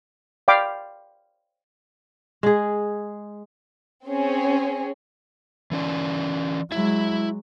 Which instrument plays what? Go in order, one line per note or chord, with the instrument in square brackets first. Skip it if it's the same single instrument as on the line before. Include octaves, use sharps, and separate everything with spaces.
[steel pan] D5 F5 G5 B5 D6
[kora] G#3 G#4
[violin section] C4 C#4 G#4 C#5
[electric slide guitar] E3 C#4 D5
[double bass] F#3 G#3 [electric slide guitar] E4 E5